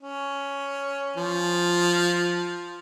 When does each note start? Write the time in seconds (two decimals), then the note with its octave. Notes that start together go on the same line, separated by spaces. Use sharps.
0.02 C#4
1.17 F3